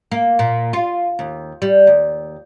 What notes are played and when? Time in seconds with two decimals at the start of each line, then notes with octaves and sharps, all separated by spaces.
0.12 A#3
0.39 A#2
0.73 F4
1.19 D#2
1.62 G3
1.87 D#2